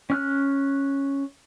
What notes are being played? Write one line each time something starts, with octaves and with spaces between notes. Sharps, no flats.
C#4 F6 F#6